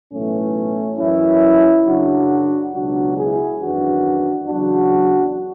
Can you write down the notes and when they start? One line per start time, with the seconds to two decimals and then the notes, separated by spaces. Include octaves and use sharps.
0.12 B1 A2 E3 A3 C#4
0.99 F#2 E3 C#4 E4
1.86 F#2 C#3 F#3 D4 F#4
2.73 C#2 B2 F#3 D4 F#4
3.16 E4 G#4
3.60 G#1 F#2 E3 D4 F#4
4.47 E2 C#3 F#3 D4 F#4